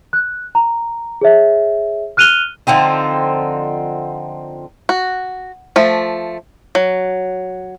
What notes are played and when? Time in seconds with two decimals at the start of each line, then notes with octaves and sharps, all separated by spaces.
0.13 F#6
0.55 A#5
1.21 G#4 C#5 E5
2.17 F6 F#6 D#7 F7 G7
2.67 D3 F3 C4 D#4
4.89 F#4
5.76 F3 A3
6.75 F#3